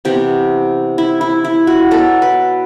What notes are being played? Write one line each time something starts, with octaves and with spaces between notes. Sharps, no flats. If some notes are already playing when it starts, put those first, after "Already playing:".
C3 E3 B3 G4
E4
E4
E4
F#4
B2 F#3 B3 A4
B4